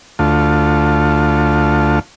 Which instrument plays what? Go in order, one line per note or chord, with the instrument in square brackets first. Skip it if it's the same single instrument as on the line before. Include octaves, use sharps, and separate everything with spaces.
[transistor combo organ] D2 A3 F4